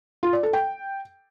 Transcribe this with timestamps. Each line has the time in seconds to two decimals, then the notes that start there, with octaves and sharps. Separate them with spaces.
0.23 F4
0.33 D5
0.43 A4
0.53 G5